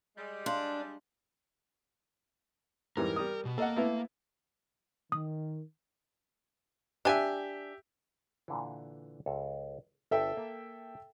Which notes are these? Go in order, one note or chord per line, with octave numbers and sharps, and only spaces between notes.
G3 G#3
D4 F5 C6
G#2 E3 G3 A#4
G3 D#6
B2
A#3 A4 D#5 F#5
A3 B3 E4
D#3 D#6
D4 G4 E5 G#5
A#2 D3 E3
C#2 A4
G1 A4 E5 G5
A#3 A5